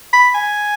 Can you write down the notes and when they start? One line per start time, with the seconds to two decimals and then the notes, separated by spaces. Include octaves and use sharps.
0.13 B5
0.35 G#5